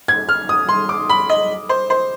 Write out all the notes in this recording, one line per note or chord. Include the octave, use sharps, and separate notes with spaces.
G#6
F6
D#6
C6
D6
B5
D#5
C5
C5